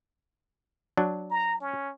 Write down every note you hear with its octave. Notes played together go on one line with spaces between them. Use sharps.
F#3 D4
A#5
C#4